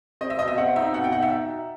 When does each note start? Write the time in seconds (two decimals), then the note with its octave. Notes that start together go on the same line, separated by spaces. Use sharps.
0.21 C4 D#5
0.30 E5
0.39 B2 D#5
0.48 E5
0.58 C4 F#5
0.76 D#4 E5
0.94 B2 F#5
1.04 G5
1.12 D#4 F#5
1.22 E5